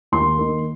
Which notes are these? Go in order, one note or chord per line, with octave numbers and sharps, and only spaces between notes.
D#2 C6
D#3 A#3